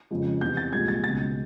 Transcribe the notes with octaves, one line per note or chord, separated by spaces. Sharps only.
F2 C#3 F3 G#3
E2 C3 E3 G6
A6
C2 A#2 F3 G#3 G#6
A6
C#2 B2 G#3 A6